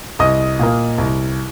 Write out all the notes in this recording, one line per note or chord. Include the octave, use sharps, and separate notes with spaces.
C2 D#5 D#6
A#2 A#3
C2